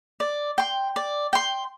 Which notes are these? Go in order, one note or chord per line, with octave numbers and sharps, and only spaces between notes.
D5
G5 C6
D5
G5 C6